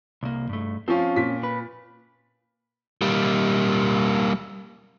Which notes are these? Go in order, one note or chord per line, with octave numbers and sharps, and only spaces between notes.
C2 A#3
G2 A3
F3 C4 C#4 F4
A#2 B6
B4
G3 A#3